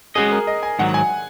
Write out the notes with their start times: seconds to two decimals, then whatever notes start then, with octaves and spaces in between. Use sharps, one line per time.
0.15 G#3 C#4 F#4 G#4 D#5
0.32 A#4
0.47 D#5
0.63 G#5
0.79 G#2 D#3 F#3 F#5
0.94 G#5